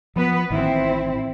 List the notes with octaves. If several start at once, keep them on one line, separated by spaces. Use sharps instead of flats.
F3 B3 B4
A1 D#3 C4 E4